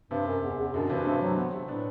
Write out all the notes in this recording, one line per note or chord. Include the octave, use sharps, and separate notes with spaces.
G2 C3
F#2
E2
E2
F#2 B2 D3
G2 C3 E3
G2 A3 C4
F#3
B3
C3
A2 B3 D4